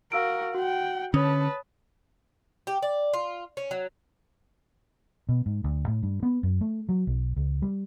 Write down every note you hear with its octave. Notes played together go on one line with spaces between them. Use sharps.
F#4 A#4 F5 E6 D7
F#4 F#5 G5
D3 C#4 B4 C#5 A5 D#6
G4
D5
F4
C#4
F#3
B2
G#2
D2
A2
G2
B3
F#2
A3
F#3
B1
C#2
G3